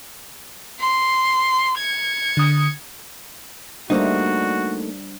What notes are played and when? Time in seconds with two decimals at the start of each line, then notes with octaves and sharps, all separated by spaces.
0.80 C6
1.77 G#6 C#7
2.37 D3 D#6
3.90 G3 A3 A#3 D4 D#4 F#4 C5